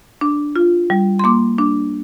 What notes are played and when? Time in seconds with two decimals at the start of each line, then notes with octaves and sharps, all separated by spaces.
0.21 D4
0.56 F4
0.90 G3
1.19 C6
1.24 A#3 D6
1.58 D4